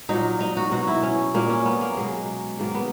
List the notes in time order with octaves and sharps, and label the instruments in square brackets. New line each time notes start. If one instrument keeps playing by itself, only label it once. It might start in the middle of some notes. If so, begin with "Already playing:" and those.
[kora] A#2 F#3 D#4
D#4
F#4
B2 F#3 F#4
E4
C#4
A#2 F#3 A#3
C#4
B3
A#3
B2 F#3 G#3
G#2 D#3 F#3 A#3
B3